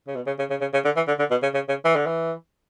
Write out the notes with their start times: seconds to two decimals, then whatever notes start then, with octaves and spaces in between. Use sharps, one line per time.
0.08 C#3
0.16 B2
0.27 C#3
0.39 C#3
0.50 C#3
0.61 C#3
0.73 C#3
0.85 D3
0.96 E3
1.08 D3
1.19 D3
1.31 B2
1.42 C#3
1.54 C#3
1.69 C#3
1.85 E3
1.96 D3
2.06 E3